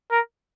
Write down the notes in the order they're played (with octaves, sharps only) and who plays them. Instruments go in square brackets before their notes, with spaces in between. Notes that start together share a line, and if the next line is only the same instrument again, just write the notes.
[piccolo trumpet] A#4